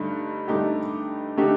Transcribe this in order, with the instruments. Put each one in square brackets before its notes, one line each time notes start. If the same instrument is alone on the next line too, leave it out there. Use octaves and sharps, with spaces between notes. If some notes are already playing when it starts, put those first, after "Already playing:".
Already playing: [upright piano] G2 D3 A3 D#4
G2 D3 A3 D#4 G4
D3 A3 D#4 G4